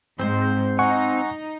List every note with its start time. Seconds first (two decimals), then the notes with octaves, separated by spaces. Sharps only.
0.19 G#2 C4 C5
0.79 D#4 F#5 G#5 C#6